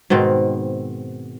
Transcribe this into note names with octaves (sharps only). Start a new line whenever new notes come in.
G#2 B2 D#3 C4